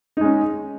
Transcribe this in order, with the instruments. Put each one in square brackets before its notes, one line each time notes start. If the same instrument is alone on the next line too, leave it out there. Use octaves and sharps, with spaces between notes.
[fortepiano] D#4
G#3
C#4